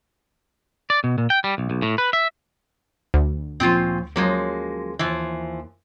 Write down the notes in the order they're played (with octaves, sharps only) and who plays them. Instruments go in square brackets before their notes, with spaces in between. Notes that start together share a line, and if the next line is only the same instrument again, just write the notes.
[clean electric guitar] D5
B2
A#2
G5
G3
B1
B1
A2
B4
E5
[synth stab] D2
[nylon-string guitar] A#2 F3 [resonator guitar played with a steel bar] C4 C#4 F4
[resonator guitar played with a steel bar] F3 G#3 A#3 [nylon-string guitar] F#3 C#4
[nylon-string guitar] D#2 A5 [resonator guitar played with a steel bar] E3 F3